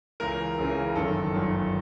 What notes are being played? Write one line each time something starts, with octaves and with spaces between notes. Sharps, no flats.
C#2 C#3 E3 A#4
C#2 C#3 E3
G1 F#2 D#3 A4
G1 F#2 D#3